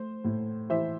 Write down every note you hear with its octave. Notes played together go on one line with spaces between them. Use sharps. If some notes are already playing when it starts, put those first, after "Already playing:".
Already playing: A3 C5
A2
E3 C5 E5